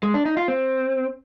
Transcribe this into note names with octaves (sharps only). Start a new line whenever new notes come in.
G#3
D4
D#4
F4
C4